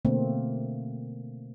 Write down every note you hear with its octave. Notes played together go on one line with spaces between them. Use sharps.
B2 D3 A3 A#3 C4